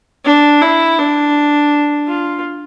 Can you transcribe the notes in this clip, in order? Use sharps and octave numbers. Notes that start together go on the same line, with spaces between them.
D4
E4
D4
F4